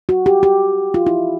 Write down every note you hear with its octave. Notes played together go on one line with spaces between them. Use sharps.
F#4
G4
G4
F4
E4